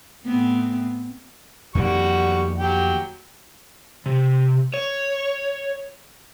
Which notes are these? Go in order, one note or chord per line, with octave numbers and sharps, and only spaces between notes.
A2 B3 C4
F2 D#3 G3 A#3 F#4 C#6
F#3 G4 G5
C3
C#5